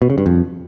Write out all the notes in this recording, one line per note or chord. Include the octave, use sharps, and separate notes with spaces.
B2
C#3
G2
F2